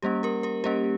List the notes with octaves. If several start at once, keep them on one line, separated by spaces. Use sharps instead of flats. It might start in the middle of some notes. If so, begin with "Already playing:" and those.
G3 A#3 C#4 G4
G4 A#4
G4 A#4
G3 A#3 C#4 G4